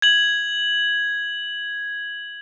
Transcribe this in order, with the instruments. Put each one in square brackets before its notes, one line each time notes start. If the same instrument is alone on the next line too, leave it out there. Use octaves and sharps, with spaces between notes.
[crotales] G#6 F#7